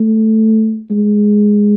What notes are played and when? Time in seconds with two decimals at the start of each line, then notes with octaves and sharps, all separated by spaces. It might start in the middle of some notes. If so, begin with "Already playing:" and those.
Already playing: A3
0.91 G#3